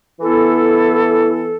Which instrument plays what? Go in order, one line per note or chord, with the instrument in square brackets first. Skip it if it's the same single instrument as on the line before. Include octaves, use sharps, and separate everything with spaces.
[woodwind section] E3 B3 E4 A4